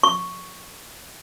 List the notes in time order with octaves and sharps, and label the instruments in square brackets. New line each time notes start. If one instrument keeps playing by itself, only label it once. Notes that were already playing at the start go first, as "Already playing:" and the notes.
[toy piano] C#6